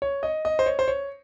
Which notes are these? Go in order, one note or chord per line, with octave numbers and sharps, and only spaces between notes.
C#5
D#5
D#5
C5
C#5
C5
C#5